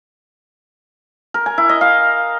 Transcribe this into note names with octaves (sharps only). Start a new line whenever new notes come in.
A#4
G#5
E4
D#5
F5